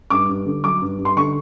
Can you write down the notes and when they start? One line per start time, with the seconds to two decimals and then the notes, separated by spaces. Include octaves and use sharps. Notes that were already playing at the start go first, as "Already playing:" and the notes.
0.10 G2 D6
0.29 G2
0.46 D3
0.64 F#3 D6
0.81 G2
0.99 G2
1.05 C6
1.17 D3 C#6